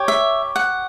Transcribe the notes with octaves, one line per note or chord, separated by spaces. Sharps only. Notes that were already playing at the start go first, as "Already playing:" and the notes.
Already playing: G4 C#5
E5
F#5